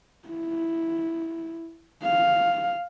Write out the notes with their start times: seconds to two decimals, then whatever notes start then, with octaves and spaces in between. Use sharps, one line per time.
0.28 E4
2.03 F5